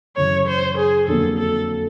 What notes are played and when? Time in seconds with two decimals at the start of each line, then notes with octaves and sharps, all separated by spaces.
0.16 F#2 C#3 E3 C#5
0.47 C5
0.77 G#4
1.07 F2 D3 F#3 A#3 A4
1.38 A4